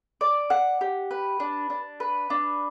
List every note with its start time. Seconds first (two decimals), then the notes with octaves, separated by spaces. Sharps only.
0.21 D5
0.50 F#5
0.81 G4
1.11 B4
1.40 D4
1.70 D4
2.00 B4
2.30 D4